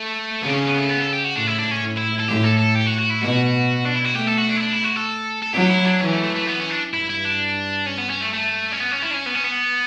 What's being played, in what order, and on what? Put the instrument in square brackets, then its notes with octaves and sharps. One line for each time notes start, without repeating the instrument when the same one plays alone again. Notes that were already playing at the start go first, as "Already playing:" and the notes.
Already playing: [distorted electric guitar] A3
[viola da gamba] C#3 [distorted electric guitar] B3
[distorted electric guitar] D4
C#4
B3
A3
B3
A4
G4
F#4
[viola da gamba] A2 [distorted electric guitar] D4
[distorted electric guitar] E4
D4
C#4
[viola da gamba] A2
[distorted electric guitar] E4
A4
[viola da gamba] A2 [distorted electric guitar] G4
[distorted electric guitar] A4
A4
G4
F#4
F#4
E4
[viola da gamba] B2 [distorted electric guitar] F#4
[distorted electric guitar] D4
E4
F#4
[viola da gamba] A3 [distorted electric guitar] G4
[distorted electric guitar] A4
F#4
D4
E4
D4
E4
F#4
A4
A4
[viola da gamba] F#3 [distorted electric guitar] G4
[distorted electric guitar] E4
D4
[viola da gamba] E3 [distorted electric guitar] C#4
[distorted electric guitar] A3
A3
A3
B3
C#4
D4
[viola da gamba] G2 [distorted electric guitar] E4
[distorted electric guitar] E4
D4
C#4
B3
C#4
A3
A3
C#4
B3
C#4
E4
D4
C#4
B3
C#4
B3